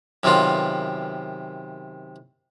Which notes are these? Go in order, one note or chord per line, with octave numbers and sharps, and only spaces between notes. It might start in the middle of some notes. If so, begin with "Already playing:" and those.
F#2 C3 D#3 B3 F4